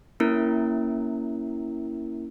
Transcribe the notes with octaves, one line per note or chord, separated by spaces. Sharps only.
A#3 C#4 E4 A#4